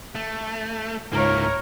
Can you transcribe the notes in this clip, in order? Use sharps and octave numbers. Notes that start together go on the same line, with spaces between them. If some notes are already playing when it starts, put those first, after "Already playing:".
A3
C#2 G#2 A#3 E4 A#4 C#5